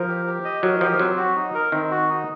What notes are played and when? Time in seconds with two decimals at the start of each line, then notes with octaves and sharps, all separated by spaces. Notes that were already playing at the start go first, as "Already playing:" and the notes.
Already playing: F3 A#4
0.08 G4
0.27 G4
0.45 D#5
0.62 F#3 A#4
0.81 F3 G4
0.99 F#3 C4
1.17 F#4
1.36 D#4
1.55 A#4
1.72 D#3 C4
1.91 F#4
2.09 D#4